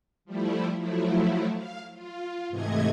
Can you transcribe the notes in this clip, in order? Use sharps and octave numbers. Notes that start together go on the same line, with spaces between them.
F3 G3 A3 E4
F3 F#3 A3 E4
F5
F4
G#2 C3 E3 A3 D#5 G#6